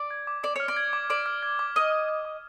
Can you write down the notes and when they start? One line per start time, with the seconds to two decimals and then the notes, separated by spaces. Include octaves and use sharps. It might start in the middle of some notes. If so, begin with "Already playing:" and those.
Already playing: D5
0.11 G#6
0.27 D6
0.43 D5 D6
0.56 C#5 F6
0.68 D5
0.76 G#6
0.93 D6
1.10 D5 D6
1.26 F6
1.43 G#6
1.59 D6
1.76 D#5 D6
1.92 F6
2.09 G#6
2.25 D6